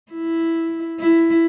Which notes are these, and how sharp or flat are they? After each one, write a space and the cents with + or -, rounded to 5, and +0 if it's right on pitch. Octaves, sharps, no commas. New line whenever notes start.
E4 +0
E4 +10